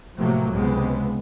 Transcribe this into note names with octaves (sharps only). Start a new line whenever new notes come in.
A2 C3 F3 F#3 A3 A#3
C#2 C3 G#3 B3